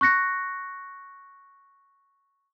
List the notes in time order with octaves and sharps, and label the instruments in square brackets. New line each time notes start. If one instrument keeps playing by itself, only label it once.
[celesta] C#6 F#6 A#6 C#7